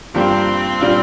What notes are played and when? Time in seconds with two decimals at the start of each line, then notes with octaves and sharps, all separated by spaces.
0.15 G2 F3 A#3 C4 D4 G4
0.81 A#2 G3 D4 F4